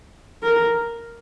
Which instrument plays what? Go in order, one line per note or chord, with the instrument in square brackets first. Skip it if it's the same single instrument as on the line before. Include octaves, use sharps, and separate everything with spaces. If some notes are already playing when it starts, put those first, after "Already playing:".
[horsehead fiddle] A#4